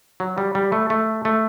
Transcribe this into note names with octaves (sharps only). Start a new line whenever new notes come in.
F#3
G3
G3
A3
A3
A3